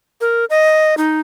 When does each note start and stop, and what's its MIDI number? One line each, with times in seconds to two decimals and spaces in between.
0.21 0.45 70
0.50 0.95 75
0.97 1.20 63